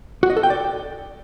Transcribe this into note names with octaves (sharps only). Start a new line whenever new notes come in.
F#4
D#5
A4
G5
D5